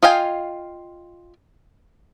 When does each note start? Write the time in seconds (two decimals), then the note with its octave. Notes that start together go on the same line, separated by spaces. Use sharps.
0.02 F4 D#5 F5 G5 G#5